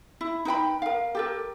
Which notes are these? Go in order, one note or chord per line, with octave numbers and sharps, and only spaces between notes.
E4
D#4 B4 G5 B5
A#4 F5
G4 A4 A#4